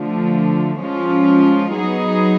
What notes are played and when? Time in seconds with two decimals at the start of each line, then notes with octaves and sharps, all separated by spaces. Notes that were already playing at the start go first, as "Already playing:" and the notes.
Already playing: D3 F3 A3
0.80 F3 G#3 C#4 F4
1.74 F#3 B3 D#4 G#4